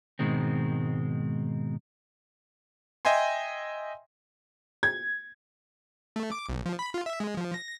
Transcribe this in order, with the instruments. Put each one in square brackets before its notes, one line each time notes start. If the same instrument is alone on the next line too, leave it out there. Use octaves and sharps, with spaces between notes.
[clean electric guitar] G#2 B2 D#3 G#3 C4
[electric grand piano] D#5 E5 G5 G#5 C6
[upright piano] G#6
[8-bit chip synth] A3
D6
B1
F3
B5
F4
E5
G#3
F3
A#6